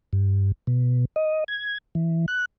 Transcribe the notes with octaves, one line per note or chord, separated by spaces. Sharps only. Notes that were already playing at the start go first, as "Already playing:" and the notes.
G2
B2
D#5
G#6
E3
F#6